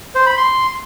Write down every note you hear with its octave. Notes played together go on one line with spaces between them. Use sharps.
C5
B5
C6